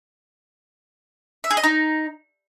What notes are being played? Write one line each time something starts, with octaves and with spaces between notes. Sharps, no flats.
E5
G#4
D#5
D#4